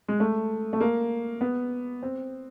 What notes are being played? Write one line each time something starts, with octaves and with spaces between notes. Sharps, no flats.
G#3
A3
A3
A#3
B3
C4